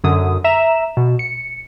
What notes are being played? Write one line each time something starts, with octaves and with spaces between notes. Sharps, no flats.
F#2 D3 D#6
E5 A#5 E7
B2
C#7